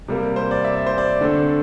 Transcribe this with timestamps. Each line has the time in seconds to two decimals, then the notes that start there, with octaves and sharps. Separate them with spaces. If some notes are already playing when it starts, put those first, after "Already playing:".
0.08 C3 G3 A#3
0.36 C5
0.51 D5
0.65 E5
0.76 D5
0.86 C5
0.98 D5
1.21 D3 A3 C4